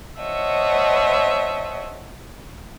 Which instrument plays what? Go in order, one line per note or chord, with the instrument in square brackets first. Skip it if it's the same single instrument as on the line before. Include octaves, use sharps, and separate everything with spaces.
[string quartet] C5 C#5 D#5 E5 F#5 A5